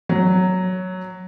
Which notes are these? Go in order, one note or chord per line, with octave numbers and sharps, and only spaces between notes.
F#3